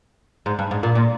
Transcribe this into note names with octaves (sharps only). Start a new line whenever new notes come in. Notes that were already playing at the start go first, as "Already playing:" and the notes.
G#2
G2
G#2
A#2
A#2